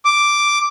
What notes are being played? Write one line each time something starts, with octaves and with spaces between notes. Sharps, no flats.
D6